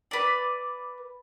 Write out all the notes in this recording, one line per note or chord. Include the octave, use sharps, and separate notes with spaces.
B4 D5